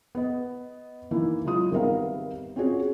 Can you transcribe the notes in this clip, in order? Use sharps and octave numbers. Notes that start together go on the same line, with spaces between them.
B3 D#5
D#3 E3 A#3 E4
C#3 F#3 G#3 F4 D#6
G#1 G3 B3 A#4 E5 F5
C4 C#4 F4 F#4 G#4 C#5